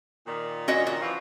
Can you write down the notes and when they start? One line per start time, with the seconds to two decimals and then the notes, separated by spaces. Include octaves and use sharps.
0.27 A#2 D#3
0.68 C#4 F#4 D#5
0.87 F#4
1.01 E3 F3